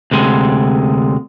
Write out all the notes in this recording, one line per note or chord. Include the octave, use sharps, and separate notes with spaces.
D2 C3 G#3